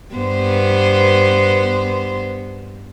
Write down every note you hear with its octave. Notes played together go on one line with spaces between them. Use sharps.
G2 B3 C5